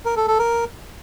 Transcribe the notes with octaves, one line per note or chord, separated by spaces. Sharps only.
A#4
A4
A4
A#4